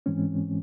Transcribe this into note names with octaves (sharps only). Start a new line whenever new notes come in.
G#2 E3 G#3 C4 C#4